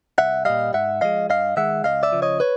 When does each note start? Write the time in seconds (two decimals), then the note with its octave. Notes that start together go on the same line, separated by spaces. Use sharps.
0.18 C2 E5 F#5
0.45 A#2 G3 D#5 F5
0.73 G#2 E5 F#5
1.01 F3 G#3 D#5 F5
1.29 G2 D#5 F5
1.57 D#3 G#3 E5 F#5
1.84 C#2 D#5 F5
2.03 D5 E5
2.12 C#3 F3
2.22 C#5 D#5
2.40 B4 C#5